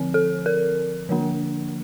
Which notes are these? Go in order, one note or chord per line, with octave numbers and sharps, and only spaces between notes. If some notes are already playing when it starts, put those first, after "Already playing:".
Already playing: D3 F3 C4
A4
A#4
D3 F3 A#3 D4